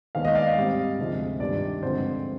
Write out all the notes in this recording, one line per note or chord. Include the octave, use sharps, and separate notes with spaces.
D#2 D#3 G#3 B3 F5
D#5
D5 F5
G#2 G3 C4
D2 C3 F3 G#3
G2 D#3 G3 D5
G2 D3 F3 G#3 C4 C5